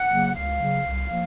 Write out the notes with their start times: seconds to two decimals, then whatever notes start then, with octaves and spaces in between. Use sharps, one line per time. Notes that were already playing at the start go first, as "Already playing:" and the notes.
Already playing: F#5
0.10 C#3 F#3 A#3
0.35 C#2 F5
0.59 C#3 F#3 A#3
0.85 C2
1.10 F3 A#3